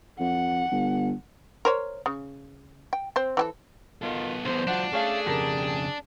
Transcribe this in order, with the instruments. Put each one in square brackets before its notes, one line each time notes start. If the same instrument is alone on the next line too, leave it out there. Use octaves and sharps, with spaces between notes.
[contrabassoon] F2 [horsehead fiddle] F#5
[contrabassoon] G1
[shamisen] A#4 C5 C#5
C#3
G5
C4 C5
E3 G4 A4
[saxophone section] B2 D#3 F4 [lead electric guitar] B3 A4
[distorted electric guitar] B1 E2 [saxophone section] C5
[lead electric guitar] F#3 F4 [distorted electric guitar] D4 [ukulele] F#5
[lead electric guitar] A3 A4 [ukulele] C#4 F5 [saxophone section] G#4
[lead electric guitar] F2 C#3 [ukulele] G4 A4 A#4